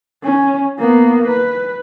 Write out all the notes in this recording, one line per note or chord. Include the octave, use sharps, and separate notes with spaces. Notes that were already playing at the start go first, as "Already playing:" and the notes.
C#4
A#3 B3
B4